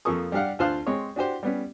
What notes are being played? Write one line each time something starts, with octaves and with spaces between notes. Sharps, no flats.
F2 F3 A#3 A4 C#6 D#6
G3 D4 G4 F5 F#5
D2 F4 C5 F5 A5 F#6
G#3 C4 C#5
D4 F#4 G4 C5
G3 B3 C#4